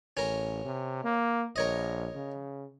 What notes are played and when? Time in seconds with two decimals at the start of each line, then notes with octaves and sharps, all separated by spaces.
0.17 A1 C#4 A#4
0.65 C3
1.04 A#3
1.56 A#1 A#4 C#5 D#5
2.15 C#3